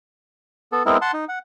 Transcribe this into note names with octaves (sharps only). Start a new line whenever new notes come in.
B3 A4
G#3 B3 C4 E4 A#4
F#5 A5 C6
D#4
F#5